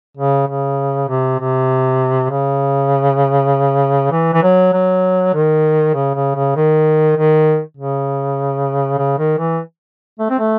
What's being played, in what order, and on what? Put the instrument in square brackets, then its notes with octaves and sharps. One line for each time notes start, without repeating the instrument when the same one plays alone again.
[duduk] C#3
C#3
C3
C3
C#3
E3
E3
F#3
F#3
D#3
C#3
C#3
C#3
D#3
D#3
C#3
C#3
D#3
E3
A3
C4
A3